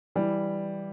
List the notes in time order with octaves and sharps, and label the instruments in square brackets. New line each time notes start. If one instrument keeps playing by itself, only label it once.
[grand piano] E3 G3